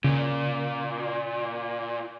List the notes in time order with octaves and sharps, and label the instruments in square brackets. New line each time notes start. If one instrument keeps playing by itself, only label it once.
[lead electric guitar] A#2 [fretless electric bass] C#3